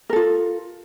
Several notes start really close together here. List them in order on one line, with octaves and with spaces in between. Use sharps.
A#4 A4 F4